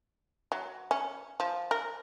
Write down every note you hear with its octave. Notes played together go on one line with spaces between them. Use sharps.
F#3
C#4
F3
A#4